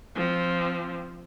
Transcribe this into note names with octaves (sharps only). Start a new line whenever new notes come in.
F3 C4